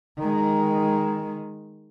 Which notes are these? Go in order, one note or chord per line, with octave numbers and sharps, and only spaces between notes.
D#3 G#3